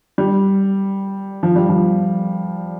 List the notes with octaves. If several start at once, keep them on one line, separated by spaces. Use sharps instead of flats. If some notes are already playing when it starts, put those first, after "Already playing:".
G3
F3
G3
F3